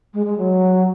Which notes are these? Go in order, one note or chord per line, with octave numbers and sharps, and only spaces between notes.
G#3
G#3
F#3